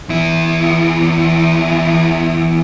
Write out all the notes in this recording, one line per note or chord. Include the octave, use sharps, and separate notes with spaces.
E2 E4